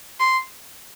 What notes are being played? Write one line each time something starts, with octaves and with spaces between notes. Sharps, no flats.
C6